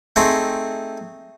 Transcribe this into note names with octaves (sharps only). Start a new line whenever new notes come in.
A3 C4 D#4 G#4